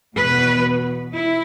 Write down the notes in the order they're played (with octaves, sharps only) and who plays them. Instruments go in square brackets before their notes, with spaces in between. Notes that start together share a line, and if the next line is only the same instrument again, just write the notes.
[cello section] E2 B2 B3 B4
E4